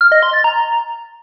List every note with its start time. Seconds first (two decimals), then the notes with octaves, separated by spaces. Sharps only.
0.01 F6
0.12 D#5
0.23 C6
0.33 A6
0.44 A#5